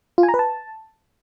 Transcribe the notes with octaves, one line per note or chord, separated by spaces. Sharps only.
F4
G#5
A#5
B4
A5